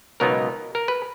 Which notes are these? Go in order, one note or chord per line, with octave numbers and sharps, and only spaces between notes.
C#2 B2 F#3 B3 D#4 A#4
A#4
B4